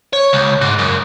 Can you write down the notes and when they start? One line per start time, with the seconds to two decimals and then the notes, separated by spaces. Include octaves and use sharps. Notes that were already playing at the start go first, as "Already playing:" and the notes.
0.13 C#5
0.33 C#2
0.61 G#2
0.78 F#2